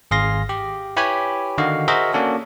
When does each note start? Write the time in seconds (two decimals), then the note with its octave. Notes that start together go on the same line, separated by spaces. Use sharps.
0.11 G#1 G#4 F5 C6 A#6
0.49 G4
0.97 E4 G4 B4 C#5 G#5 B5
1.58 D3 D#3 F#4 D#5 F5
1.88 F#4 G#4 A#4 C5 D#5 E5
2.13 A#3 C#4 D4 F#4 A4